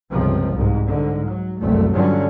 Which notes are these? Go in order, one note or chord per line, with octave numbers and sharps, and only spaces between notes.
G1 C#2 C3 F3
C2 G#2
G#2 D3
F#3
F#1 C2 A3
G2 D3 F3 F#3 C#4